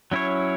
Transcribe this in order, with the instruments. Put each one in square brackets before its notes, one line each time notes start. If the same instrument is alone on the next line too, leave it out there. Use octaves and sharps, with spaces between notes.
[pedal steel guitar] F#3 C#4 E4 C#5